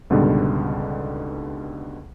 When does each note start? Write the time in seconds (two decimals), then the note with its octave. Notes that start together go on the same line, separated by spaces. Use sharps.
0.10 C#2 G#2 B2 D3 G3